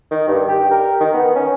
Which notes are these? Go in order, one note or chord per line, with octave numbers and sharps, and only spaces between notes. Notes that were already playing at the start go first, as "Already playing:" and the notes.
D#3
G2
G4
A#4
D#3
B3
C#4